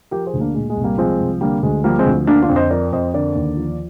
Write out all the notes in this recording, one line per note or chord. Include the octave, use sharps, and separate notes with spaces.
F3 G4 A#4
G#4 C5
D2
A#3 D4
A#2 G#3
G#3
C2
G3 A#3
F3 G#3 C4
C2
D3 G3 A#3
D2 G#3
F3 G3 A#3
G#3 C4
D2
D3 A#3 D4
D4 F4
F2
C5 D#5
F3 A#4 D5
F2 C5 D#5
D3 A#4 D5
D#2
F3